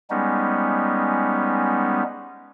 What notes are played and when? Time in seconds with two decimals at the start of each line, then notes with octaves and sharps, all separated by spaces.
0.10 G3 G#3 B3 C#4 D#4